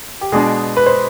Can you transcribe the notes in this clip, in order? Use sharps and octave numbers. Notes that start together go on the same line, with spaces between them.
G4
B2 G#3 D4 G#4
B4
C5